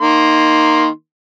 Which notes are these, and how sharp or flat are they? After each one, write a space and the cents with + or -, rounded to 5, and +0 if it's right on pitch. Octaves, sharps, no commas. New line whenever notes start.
D#3 +0 A#3 +0 C6 +0